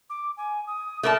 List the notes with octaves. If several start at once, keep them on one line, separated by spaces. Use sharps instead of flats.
D6
G#5
D#6
A3 A#4 A5 D6